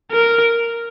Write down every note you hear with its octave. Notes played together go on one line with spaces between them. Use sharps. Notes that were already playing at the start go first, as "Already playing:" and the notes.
A#4